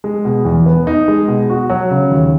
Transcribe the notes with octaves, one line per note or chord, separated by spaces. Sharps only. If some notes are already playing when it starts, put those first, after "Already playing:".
G#3
B2
E2
B3
D#4
G#3
B2
F#4
F#3
C#3
D#2